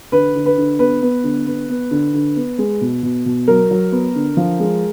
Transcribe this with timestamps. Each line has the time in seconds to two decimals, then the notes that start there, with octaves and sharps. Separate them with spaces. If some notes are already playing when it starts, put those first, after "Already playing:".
0.12 D3 B4
0.35 D3
0.46 B4
0.58 D3
0.79 B3 B4
1.02 B3
1.24 D3
1.47 B3
1.70 B3
1.91 D3
2.14 D3
2.36 B3
2.58 G#3
2.81 B2
3.03 B2
3.26 B2
3.48 F#3 A#4
3.71 F#3
3.92 B3
4.15 D3
4.37 F3
4.60 G#3